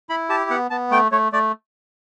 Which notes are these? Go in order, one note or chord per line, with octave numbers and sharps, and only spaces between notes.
E4 B5
G4 A5
B3 F#5
B3 A5
A3 G5
A3 C#5
A3 D5